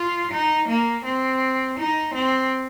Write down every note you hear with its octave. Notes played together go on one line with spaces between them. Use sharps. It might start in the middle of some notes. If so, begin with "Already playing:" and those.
Already playing: F4
D#4
A#3
C4
D#4
C4